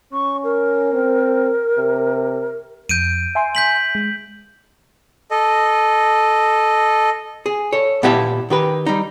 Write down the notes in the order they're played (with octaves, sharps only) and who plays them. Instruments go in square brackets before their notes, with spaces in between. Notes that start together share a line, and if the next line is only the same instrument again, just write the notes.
[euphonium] C#4 [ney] C#6
[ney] A#4
[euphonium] C4
C3
[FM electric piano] F2 [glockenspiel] G6 D7 D#7
[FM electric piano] E5 G#5 C6
[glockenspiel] G6 B6 F#7
[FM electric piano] G#3
[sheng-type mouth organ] A4 D#5
[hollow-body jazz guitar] G#4
A4 C#5
A#2 B3 E4 G4 E5 A5
D#3 G4 B4
G3 D#4